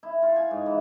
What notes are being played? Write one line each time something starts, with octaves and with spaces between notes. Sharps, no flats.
E4
F4
G#5
G#2
E3